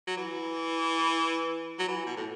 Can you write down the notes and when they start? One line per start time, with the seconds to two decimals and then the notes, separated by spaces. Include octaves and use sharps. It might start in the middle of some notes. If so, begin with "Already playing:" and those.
0.07 F#3
0.17 E3
1.79 F#3
1.88 E3
2.06 B2
2.17 A2